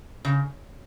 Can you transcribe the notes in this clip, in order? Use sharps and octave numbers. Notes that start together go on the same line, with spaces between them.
C#3